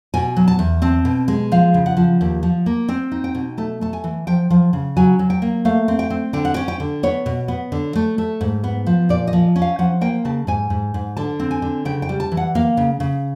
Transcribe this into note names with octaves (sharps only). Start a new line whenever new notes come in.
B2 G#5
F#3
A5
E2
C4 A5
B2
G#3
F3 F5
C#3
F#5
F3
D#2
F3
A#3
C4 G5
D#4
G5
B2
A3 A5
A3 A5
G#5
E3
F3 G5
F3
C#3
F#3 G#5
F#3
G5
A#3
A3 F5
C4
G5
C4
D3 G5
F#5
C#4 G5
G5
D3
B3 C#5
B2
B3
D3
A3
A3
G#2
B3
F3
A#2 D5
D#5
F3
C#4
F5
F3 F#5
A#3 G5
C#3 A5
G#2 G#5
G#2
G#2
D3 A5
C4
G#5
D3
C#3 G5
G5
G3
A5
E3
F#5
A#3 F5
C#3
C#3